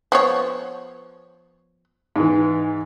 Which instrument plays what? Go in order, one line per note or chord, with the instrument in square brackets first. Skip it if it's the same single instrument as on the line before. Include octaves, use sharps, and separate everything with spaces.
[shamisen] F3 B3 C#5
[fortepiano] G#2 E3